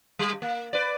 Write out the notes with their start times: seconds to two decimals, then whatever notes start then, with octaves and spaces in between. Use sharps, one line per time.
0.19 G3
0.42 A#3
0.73 B4 D5